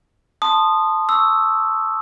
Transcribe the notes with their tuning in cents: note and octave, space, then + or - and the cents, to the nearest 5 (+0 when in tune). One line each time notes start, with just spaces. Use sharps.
A5 +0 C6 +0 D#6 -15
C#6 +0 E6 +0